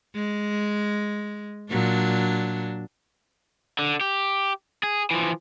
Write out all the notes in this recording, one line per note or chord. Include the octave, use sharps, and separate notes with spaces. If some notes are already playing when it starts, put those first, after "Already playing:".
G#3
A#2 F#3 D4
D3
G4
G#4
E3 F3